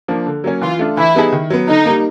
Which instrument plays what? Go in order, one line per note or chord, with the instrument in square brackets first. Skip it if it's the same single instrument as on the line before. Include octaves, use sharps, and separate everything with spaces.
[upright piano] F3 A#3 D4
D3
F#3 A#3 C#4
[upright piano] E3 [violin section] F4
[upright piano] A3 D4 F4
[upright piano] E3 [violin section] E4
[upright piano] G3 B3 D#4 G#4
D#3
F#3 B3
[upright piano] D3 [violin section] D#4
[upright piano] G3 A#3